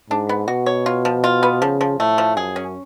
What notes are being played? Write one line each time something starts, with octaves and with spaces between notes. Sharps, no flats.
G#2 D4
B3
B2 F#4
C#5
F4
F3
F4
B3
C#3 F3
F3
A2 A3
F3
F#2 G#4
C#4